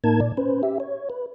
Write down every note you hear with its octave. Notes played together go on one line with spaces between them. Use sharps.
A2 A#3 D#4 A#4 A5 G#6
A#2 D5
C#4 B4 C5
G4 E5
C#5
B4